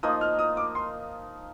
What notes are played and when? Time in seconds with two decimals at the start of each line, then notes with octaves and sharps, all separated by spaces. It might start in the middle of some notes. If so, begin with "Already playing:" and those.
0.03 F3 A#3 D#4 D#6
0.21 F6
0.39 D#6
0.57 D6
0.75 C6